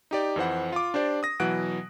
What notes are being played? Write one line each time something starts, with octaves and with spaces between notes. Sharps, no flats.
D#4 G4 D5
F2 E3 C5 F#5
F4 D6
D4 G4 C5 D5
D#6 A#6
B2 E3 F#3 F#5 F#6 D7